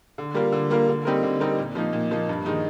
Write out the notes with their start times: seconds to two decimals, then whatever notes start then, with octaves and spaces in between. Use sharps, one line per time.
0.18 D3
0.35 G3 A#3 F4 A#4
0.52 D3
0.70 G3 A#3 F4 A#4
0.88 D3
1.05 G3 C4 D#4 A#4
1.23 D3
1.41 G3 C4 D#4 A#4
1.58 A#2
1.75 F3 A#3 D#4
1.93 A#2
2.11 F3 A#3 D#4
2.29 G2
2.46 D#3 G#3 D#4